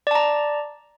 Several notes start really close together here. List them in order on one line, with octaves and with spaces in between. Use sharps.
D5 A5 A#5